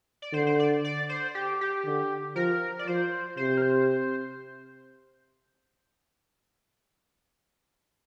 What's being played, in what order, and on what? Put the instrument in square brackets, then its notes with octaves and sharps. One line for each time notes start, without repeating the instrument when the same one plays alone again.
[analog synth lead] D5
[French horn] D3 [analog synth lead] C5
[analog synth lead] C5
D5
D5
C5
G4
G4
[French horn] D3
[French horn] F3 [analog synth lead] A#4
[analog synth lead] D5
[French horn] F3 [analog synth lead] C5
[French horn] C3 [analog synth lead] C5
[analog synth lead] A#4
C5